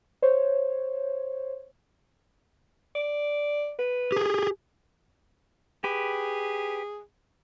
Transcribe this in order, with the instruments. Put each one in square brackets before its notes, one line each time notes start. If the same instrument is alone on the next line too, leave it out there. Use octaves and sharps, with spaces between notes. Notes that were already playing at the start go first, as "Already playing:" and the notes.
[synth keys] C5 C#5
[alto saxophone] D5
B4
[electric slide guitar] G4 G#4
[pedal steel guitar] G4 B4 [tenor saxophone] G#4